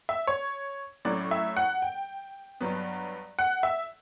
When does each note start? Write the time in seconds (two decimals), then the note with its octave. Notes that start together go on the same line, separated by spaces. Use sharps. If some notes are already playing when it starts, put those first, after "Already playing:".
0.09 E5
0.27 C#5
1.05 A2 F#3 A3 C#4 D5
1.31 E5
1.57 F#5
1.82 G5
2.61 G2 F#3 B3
3.39 F#5
3.63 E5